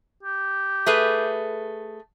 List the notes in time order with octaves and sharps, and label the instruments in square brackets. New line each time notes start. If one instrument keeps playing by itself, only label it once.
[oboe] G4
[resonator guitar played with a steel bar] A3 G#4 B4